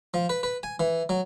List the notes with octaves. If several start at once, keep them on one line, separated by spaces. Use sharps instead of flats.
F3
B4
B4
G#5
E3
F#3